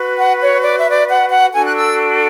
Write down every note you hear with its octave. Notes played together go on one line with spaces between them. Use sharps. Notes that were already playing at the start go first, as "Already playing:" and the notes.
Already playing: F#4 B4
F#5
C#5
D5
E5
D5
F#5
F#5
D4 F#4 A4 G#5
F#6
E6